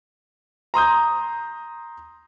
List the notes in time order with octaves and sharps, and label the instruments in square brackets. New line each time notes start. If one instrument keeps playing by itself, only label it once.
[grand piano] A#5 C6 D#6 G6